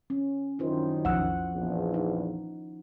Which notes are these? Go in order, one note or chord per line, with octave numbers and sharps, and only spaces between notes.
C#4
F#2 D#3 E4 F4 C5
B1 F2 F3 F#5 E6
A#1 E2
D#4